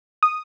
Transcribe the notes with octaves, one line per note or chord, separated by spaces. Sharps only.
D#6